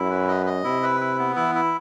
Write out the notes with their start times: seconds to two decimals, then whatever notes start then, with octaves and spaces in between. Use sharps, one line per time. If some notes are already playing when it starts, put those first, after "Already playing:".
Already playing: F#2 E4
0.10 B4
0.28 D#5
0.46 D#5
0.64 C3 E4
0.83 B4
1.00 E4
1.19 B3
1.36 E3 E4
1.55 E4